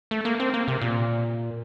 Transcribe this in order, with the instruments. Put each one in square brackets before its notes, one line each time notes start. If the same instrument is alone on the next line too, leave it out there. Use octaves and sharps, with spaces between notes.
[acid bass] A3
A#3
C4
A#3
C3
A#2